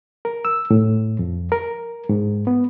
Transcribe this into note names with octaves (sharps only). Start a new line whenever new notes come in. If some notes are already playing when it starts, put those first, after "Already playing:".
A#4
E6
A2
F2
A#4
G#2
B3